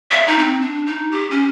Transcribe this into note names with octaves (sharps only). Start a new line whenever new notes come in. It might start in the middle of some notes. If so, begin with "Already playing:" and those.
E5
D#4
C4
D4
D#4
G4
C#4